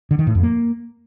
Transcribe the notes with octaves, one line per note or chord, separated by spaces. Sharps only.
D3
D#3
A2
F2
A#3